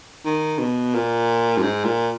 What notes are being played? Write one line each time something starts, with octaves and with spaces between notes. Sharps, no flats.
D#3
B2
A#2
F#2
G#2
A#2